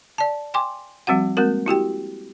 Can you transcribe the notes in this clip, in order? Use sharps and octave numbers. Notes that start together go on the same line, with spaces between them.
D5 A5
G5 G#5 C6 D6
F3 G3 C4 F#4 F#5
G#3 A#3 C4 F#4 A#4
E4 F#4 G4 G5